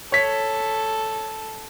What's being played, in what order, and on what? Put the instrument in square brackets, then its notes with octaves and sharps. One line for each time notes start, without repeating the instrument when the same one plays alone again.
[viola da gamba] A4 [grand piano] C#5 B6